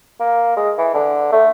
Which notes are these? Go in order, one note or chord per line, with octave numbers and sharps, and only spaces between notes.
A#3
G#3
E3
D3
A3